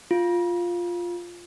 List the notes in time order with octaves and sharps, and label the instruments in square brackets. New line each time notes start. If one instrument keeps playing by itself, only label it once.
[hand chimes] F4